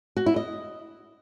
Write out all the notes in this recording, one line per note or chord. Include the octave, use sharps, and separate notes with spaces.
F#4
E4
D#5